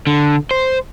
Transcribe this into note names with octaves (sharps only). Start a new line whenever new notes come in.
D3
C5